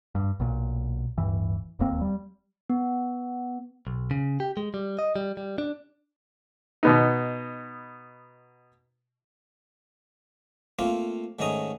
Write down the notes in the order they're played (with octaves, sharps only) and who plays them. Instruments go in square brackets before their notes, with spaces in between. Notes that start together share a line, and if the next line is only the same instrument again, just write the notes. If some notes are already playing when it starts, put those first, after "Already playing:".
[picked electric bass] G2
B1 A#2
D1 G2 E3
D1 D#2 A#3 C4
G3
[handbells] B3
[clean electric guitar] B1
C#3
G4
G#3
G3
D#5
G3
G3
D4
[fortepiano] B2 B3 D#4
[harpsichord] A3 A#3 C4 F4
G#2 D#3 A3 C#4 A#5 D#6